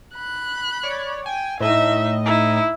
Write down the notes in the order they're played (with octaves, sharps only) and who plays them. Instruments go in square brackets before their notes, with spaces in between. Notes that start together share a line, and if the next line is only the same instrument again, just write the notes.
[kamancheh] B5 F#6
[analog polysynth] C#5 D5
[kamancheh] G5 [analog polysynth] G#5
[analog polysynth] A2 D#5 [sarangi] D#4 [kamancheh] E5
[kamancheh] D#4 [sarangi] E4